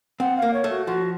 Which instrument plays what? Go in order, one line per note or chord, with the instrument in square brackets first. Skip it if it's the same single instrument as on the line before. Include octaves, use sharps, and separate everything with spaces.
[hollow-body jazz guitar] C4 [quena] F#5
[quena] F5
[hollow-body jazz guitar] A#3
[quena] C#5
[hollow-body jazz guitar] A3
[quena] F#4
[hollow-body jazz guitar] F3 [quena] F#4